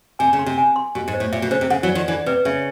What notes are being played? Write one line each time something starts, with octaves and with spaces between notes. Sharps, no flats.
C3 G#5
C#3
C6
C3
G#5
C6
B2 G4
G#2
C5
A2
A#2 E5
B2
C#3 C5
C3
C#3 F#5
E3 F#3
D5
D#3 F3
D3 E3 D5
C3 B4
C#3 E5